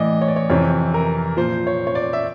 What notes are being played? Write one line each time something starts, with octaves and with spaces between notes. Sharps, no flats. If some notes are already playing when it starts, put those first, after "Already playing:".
Already playing: A2 E3 D5 D#5
C#5
D5
C#5
F2 C3 E3 C#5
A#4
A#2 F3 C5
C#5
C#5
D5
E5